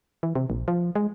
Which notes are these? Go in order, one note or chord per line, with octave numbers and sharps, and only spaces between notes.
E3
C3
A#1
F3
G#3